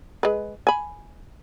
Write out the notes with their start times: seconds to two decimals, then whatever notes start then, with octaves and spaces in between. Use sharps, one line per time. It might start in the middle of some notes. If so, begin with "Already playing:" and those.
0.23 G#3 B4
0.67 G#5 B5